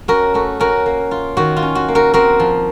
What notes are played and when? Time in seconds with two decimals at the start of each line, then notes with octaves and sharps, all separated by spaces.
0.08 C#4 F#4 A#4
0.34 A3 F#4
0.60 C#4 F#4 A#4
0.86 A#3
1.11 F4
1.37 D#3 F#4
1.57 F4
1.62 C#4
1.75 F#4
1.88 A#3
1.95 F#4 A#4
2.14 C4 F#4 A#4
2.39 F3